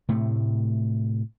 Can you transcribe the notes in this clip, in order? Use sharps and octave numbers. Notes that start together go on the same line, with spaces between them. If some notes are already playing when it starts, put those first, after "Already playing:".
A2 C3 A3